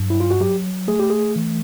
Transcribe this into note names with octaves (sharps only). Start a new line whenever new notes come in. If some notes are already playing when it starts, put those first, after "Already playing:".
Already playing: G2 F#3
E4
F4
F#4
F#3 G4
A3 G#4
G4
G#4
E3